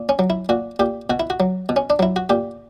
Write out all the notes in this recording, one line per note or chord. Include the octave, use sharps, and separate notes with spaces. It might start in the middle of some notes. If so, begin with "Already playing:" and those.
Already playing: A#2
C#4
F#3
E4
A#2 F#4
A#2 G4
B2 F#4
E4
F#4
F#3
B2
C#4
D4
F#3 E4
F#4
A#2 G4